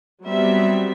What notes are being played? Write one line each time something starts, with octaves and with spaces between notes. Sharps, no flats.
F#3 G3 B3 C4 E5